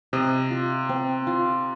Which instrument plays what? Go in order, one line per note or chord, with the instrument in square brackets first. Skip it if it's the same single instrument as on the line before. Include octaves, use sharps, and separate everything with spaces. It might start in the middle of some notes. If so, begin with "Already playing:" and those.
[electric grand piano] C3 [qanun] D#5
[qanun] F4
C4
F4